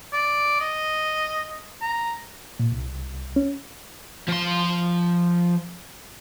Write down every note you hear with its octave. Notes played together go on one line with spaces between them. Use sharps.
D5
D#5
A#5
A#2
C2
C#4
F3 C6